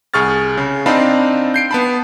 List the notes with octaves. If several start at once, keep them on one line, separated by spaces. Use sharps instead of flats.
C2 G#4 C#6 F6 A6
C#3
C4 D4 D#4 F5 A5 B5
G6 C7 D7
B3 A5 B5